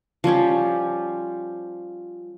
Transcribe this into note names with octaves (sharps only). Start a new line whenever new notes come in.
F3 G3 C#4 G4